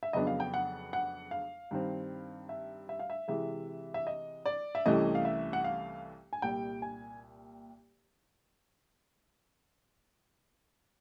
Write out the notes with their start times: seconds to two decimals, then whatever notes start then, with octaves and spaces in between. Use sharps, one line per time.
0.03 E5
0.13 F2 C#3 F#3 B3 D4 D#5
0.27 F5
0.40 G5
0.54 F#5
0.93 F#5
1.31 F5
1.71 G2 D#3 G3 C4
2.49 E5
2.89 E5
2.99 F5
3.10 E5
3.28 C3 E3 G#3 E5
3.94 E5
4.07 D#5
4.46 D5
4.75 E5
4.86 C2 C3 E3 A3 C#4 D#5
5.15 F5
5.25 E5
5.53 F#5
5.64 F5
6.33 G#5
6.42 C2 A#2 G3 G5
6.82 G#5